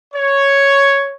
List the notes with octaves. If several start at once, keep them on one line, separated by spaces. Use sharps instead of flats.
C#5